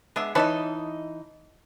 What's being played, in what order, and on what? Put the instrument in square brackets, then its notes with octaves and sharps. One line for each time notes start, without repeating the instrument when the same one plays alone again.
[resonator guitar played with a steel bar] G#3 [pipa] B3 D4 E5
[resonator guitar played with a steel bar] E3 D#4 D#5 [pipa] B4 C#5 A5